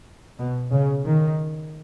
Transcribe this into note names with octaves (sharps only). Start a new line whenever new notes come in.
B2
C#3
D#3